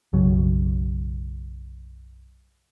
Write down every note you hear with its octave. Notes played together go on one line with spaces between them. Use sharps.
B1 F#2 C#3 F#3